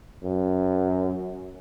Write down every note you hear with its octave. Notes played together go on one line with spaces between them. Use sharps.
F#2